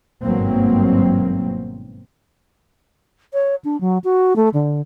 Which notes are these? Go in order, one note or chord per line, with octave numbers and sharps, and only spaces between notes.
G#1 G2 B2 F#3 A#3 C4
C#5
D4
F#3
F#4
A3
D3